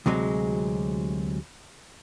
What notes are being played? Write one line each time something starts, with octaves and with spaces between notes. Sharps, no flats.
D2 C3 F#3 G#3